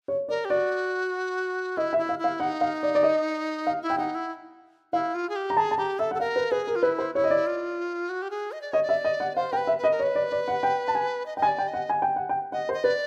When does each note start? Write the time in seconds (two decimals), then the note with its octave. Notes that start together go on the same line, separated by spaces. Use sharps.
0.08 C#5
0.29 A#4 D5
0.45 G4
0.50 F#4 D5
1.77 E4 D#5
1.93 E5
1.98 E4
2.09 F5
2.19 E4
2.24 F5
2.40 D#4 F#5
2.61 F5
2.83 D5
2.95 D5
3.03 D#5
3.67 F5
3.82 E4
3.90 G5
3.98 D#4 F#5
4.15 E4
4.93 E4 F5
5.14 F4
5.29 G#4
5.36 G4
5.50 A#5
5.57 G#4 A5
5.71 A5
5.78 G4 A#5
5.99 A4 E5
6.11 A4 F#5
6.20 A#4 F5
6.36 B4
6.51 G#4 B4
6.67 A#4
6.76 F4
6.83 E4 B4
6.98 C5
7.15 E4 C#5
7.24 D#5
7.31 D5
7.47 F4
8.09 F#4
8.22 G4
8.30 G#4
8.52 D#5
8.61 D5
8.72 C#5 D#5
8.83 D5
8.89 E5
9.04 D#5
9.20 F#5
9.36 C5 F5
9.52 A#4 G5
9.57 B4
9.67 E5
9.78 B4
9.84 D#5
9.91 A#4
9.99 C#5
10.03 B4
10.15 D5
10.32 D5
10.48 F#5
10.63 G5
10.88 A5
10.95 G#5
11.26 D#5
11.37 D#5 G5
11.42 G#5
11.47 D5
11.58 G5
11.68 D#5
11.74 F#5
11.89 G#5
12.02 G5
12.16 F#5
12.29 G5
12.52 D#5 F#5
12.69 C5
12.74 D#5
12.84 B4 D5